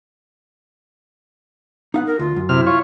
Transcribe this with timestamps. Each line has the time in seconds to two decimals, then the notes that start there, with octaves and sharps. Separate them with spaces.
1.94 B3 D#4 F5 F#5
2.07 A#4
2.19 D2 F4
2.36 F#2
2.49 C3 E4 F6
2.67 F4 C#5